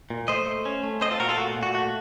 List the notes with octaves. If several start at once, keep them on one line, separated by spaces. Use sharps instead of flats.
A#2
A3 C5 D#5
A3
C#4
A3
C4 C5 D#5
F4 A4
A#2 F#4 A#4
F4 A4
A3 F#4
A#2
F#4
A3 F#4